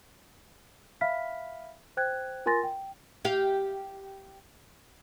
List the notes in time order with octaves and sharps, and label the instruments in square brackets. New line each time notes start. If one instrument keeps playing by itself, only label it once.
[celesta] E5 F5 B5 F6 B6
C5 G5 F#6 G#6
F4 A#4 G#5 C6 A6 A#6
G5
[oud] G4 F5